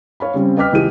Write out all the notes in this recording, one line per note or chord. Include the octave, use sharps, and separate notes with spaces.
C#5 F5 B5
C#3 G3 C4
B4 D#5 G5 D6 F6 B6
C#2 E3 G4 G#4 D#7